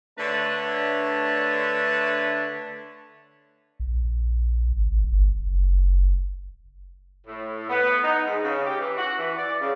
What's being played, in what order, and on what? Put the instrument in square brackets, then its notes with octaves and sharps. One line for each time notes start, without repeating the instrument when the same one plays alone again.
[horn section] D3 A3 D4 B4 C#5 A5
[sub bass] A#1
G#1
G1
F#1
[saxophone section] A2
B3
D#4
G#2
C#3
G4
E3
F#4
E3
D5
C#3